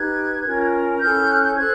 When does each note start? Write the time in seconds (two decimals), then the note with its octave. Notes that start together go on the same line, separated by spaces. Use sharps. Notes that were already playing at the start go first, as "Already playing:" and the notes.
Already playing: D#4 G4 B4 F#6 G#6
0.45 C#4 F4 A#4
1.01 C#4 E4 A4 F6 G6
1.28 F#6
1.43 G6
1.56 A4 C5 F#6 G#6